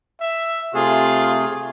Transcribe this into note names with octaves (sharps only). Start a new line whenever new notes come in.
E5
C3 A3 F4 G#4